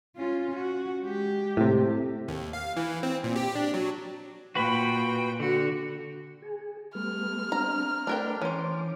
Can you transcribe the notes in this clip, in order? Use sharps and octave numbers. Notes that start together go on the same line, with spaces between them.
C#4 F4
F#4
G#3 G4
A2 C3
D#2
F5
E3
C4
A#2
G4
D4
F#3
A#2 F#4 B4 G5 B5
D3 F#4
G#4
G3 A3 B3 F6
C4 D4 A#5
A3 D4 A#4 B4 G5
E3 C#4 C5 D6